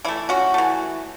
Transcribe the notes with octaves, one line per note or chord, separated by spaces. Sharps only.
E3 A3 E4
C#4 F#4
E3 A3